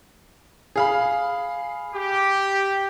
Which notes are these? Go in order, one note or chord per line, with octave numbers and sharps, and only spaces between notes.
G#4 F5 B5
G4